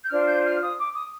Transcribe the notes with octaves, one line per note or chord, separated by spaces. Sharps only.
G6
D4 F4 C5 F6
G6
F6
D#6
D6
D#6